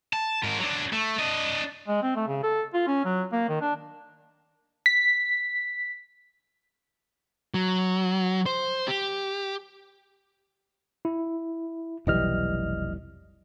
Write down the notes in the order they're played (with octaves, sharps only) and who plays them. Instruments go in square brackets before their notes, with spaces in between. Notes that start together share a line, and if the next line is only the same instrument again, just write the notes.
[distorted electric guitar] A5
G#2 A#4
F#3 D4
A3
D4 D#5
[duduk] G#3
C4
A3
C#3
A4
F4
C#4
F#3
A#3
D#3
D4
[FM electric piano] B6
[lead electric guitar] F#3
C5
G4
[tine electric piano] E4
[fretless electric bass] F1 E3 G3 [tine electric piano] B1 D#5 F6